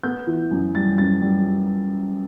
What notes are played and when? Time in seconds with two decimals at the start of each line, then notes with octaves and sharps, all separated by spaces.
0.04 B3 G6
0.27 E3
0.51 F#2
0.75 G3 A6
0.98 F#2 A6
1.22 G3